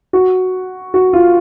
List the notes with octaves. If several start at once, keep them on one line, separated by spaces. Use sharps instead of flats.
F#4
F#4
F4